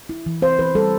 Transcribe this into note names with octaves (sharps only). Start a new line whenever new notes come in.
E4
E3
C4 C5
E3 B4
G3 A4